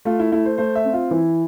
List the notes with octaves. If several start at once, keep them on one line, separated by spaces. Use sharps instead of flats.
A3 F4
E4
A3 E4
C5
A3 C5
E5
C4
F4
E3 E4